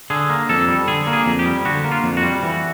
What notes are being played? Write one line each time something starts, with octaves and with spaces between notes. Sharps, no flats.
D3 G#4
A#3
F2 A4
G3
D3 G#4
A#3
G#4
F2
G4
G3
D3 F#4
A#3
F4
F2
F#4
G3
E3